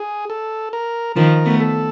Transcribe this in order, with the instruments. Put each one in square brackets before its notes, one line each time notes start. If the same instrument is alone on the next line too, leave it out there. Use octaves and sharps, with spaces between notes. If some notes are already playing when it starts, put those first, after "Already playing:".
Already playing: [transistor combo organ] G#4
A4
A#4
[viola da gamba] D#3 F3 [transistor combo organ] A#4
[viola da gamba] A3 B3
[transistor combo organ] A4